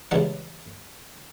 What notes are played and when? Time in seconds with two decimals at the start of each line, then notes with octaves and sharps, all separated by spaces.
0.11 C#2 C#3 E3 G3 F#5 A5